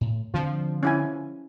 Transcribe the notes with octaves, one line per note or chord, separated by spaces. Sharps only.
A2
D3 F3 C4 D4
C#4 E4 G#5